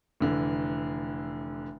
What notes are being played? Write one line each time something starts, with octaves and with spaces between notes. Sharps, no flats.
F1 D3 E3